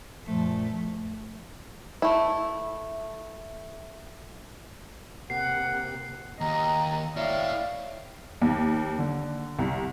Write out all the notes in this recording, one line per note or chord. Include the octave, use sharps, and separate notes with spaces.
F#2 A#2 F3 A3
A3 E4
C3 A#3 G4 F#5 C7
D#2 D#5 A#5
E4 C#5 D5 E5 F5
D#2
D3
C2